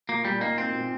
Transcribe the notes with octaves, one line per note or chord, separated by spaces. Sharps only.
A#2 A#3
A#2 G3
A#3 D#4
A#3 C4
A#2